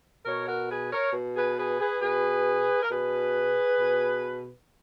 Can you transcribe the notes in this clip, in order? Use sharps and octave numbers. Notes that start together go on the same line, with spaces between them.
B2 A#4 C#5
F#4 A#4
G#4 B4
A#4 C#5
B2
G#4 B4
G#4 B4
G#4 B4
B2 G#4 B4
A#4
B2 G#4 B4
B2